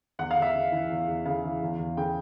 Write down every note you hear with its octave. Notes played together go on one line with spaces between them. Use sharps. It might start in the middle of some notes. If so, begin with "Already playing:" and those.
E2 F#5
F5
E2
E5
C#3
E3
E2
E2
C#3 F5
E3
E2
E2
C#3 G5